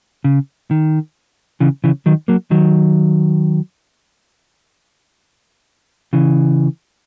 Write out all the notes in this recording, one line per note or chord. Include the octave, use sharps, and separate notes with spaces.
C#3
D#3
C#3 E3
C#3 E3
D#3 F#3
F#3 A#3
D#3 F#3
C#3 E3